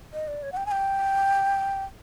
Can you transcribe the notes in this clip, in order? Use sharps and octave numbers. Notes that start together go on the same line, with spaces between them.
D#5
D5
C#5
F#5
G5
G#5
G5